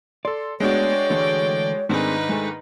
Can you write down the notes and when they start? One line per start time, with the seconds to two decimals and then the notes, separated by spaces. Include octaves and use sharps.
0.25 A4 D5 C6
0.60 G#3 A3 B3 D4 F#4 C#5 D5 G5
1.10 D3 E3 A3
1.89 G#2 D#3 A3 C4 D4 D#4 G#4 B4
2.29 G#3 A3